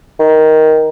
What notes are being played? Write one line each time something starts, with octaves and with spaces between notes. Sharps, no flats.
D#3